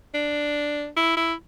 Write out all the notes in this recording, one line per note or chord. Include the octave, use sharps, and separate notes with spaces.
D4
E4
E4